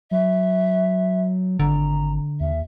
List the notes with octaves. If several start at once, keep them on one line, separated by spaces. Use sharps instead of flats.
F#3 E5
G#1 D3 A#5
D#2 E5